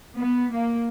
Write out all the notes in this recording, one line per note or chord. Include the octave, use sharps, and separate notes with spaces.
B3
A#3